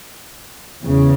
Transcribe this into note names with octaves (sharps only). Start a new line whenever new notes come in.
E2 C#3